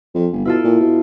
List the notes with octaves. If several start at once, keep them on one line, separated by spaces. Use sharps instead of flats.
F2
G1
B2 E4 F4 A4
A#2
B2